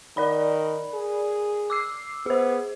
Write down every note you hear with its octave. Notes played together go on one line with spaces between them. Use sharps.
D#3 A#4 D5 B5
G#4
D6 E6 C7
B3 G#4 C5